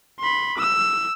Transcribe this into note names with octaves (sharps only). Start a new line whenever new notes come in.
B5 C6
E6